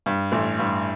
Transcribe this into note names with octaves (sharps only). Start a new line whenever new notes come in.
G2
A1
G2